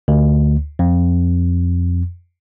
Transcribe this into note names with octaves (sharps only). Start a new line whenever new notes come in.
D2
F2